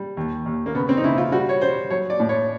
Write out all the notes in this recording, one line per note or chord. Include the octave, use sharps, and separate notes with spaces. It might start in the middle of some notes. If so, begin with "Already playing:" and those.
Already playing: G3
D#2
D#2
A#3
C#3 B3
C4
D#4
C#3 E4
F4
G3 F#4
C#5
G3 C5
F#3 C#5
D5
A2
C#5